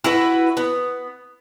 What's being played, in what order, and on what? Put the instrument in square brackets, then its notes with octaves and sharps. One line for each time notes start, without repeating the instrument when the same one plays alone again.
[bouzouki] E4 F#4 B4
B3